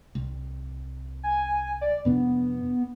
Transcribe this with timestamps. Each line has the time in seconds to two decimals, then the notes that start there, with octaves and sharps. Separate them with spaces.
0.15 C2
1.23 G#5
1.81 D5
2.05 F2 C3 B3 D4